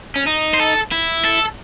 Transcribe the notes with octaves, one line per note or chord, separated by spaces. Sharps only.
C#4
D#4
C5
A4
E4
A4